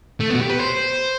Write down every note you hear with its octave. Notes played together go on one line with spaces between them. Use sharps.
A3
B3 F#4
G4
B4
C5